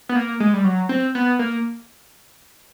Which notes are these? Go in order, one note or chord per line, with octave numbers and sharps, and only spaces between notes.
B3
A#3
G#3
G3
F#3
C4
B3
A#3